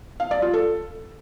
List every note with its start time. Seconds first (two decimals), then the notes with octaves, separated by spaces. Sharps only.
0.20 F5
0.31 D5
0.42 F4
0.53 A4